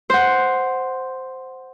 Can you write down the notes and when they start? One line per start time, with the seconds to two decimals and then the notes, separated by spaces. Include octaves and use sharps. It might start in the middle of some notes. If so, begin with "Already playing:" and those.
0.10 C5 F#5